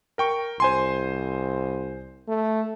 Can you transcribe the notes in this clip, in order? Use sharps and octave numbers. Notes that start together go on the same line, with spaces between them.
A#4 G5 C#6
C2 C5 G#5 C6
A3